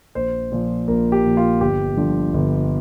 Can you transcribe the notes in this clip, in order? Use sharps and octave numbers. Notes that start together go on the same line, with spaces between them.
A#1 C5
A#2 F3
A#1 A#4
G4
A#2 F3
F4
G1 G4
G2 D3 F3
G1